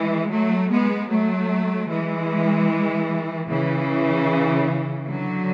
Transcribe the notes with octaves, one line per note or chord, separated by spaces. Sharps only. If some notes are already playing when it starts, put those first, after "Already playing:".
Already playing: E3 G#3
F#3 A3
G#3 B3
F#3 A3
E3 G#3
C#3 E3
D3 F#3